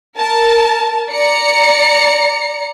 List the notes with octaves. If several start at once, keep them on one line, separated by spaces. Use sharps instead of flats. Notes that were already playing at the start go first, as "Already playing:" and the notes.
A#4 A5
D5 A#5 C#7